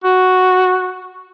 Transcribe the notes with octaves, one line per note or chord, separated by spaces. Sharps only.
F#4